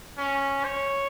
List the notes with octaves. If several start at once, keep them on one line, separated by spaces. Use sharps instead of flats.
C#4
C#5